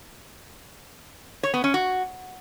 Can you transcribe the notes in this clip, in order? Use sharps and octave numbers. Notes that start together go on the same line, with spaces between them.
C#5
B3
C#4
F#4